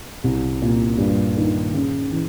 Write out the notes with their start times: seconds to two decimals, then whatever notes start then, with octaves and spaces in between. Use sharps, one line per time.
0.24 C2
0.62 A#2
0.98 G2
1.37 D#3
1.73 C#3
2.11 E3